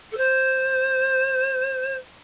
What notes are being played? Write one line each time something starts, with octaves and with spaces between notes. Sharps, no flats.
A4
C5